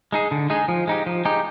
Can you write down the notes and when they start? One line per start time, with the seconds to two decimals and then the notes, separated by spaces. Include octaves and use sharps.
0.12 G#3 D#4 G#4
0.31 D3
0.50 G#3 D#4 G#4
0.68 F3
0.87 G#3 D#4 G4
1.06 F3
1.25 G#3 D#4 G4